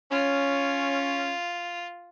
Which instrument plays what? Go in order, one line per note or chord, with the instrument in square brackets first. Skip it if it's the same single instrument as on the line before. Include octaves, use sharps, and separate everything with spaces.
[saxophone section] C#4 [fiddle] F4